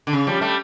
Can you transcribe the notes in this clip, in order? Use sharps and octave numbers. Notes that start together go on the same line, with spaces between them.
D3
C#3
F3 G3
G3 A3